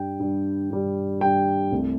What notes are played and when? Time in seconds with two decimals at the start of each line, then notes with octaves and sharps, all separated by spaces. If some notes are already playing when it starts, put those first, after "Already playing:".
Already playing: G2 G3 G5
0.19 G2 G3
0.70 G2 G3
1.21 G2 G3 G5
1.71 C2 C3 A3